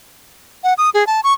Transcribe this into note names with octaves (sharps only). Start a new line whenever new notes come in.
F#5
D#6
G#4
A5
C#6